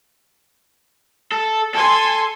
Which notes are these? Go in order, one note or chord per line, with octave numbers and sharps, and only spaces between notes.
A4
A4 G#5 C6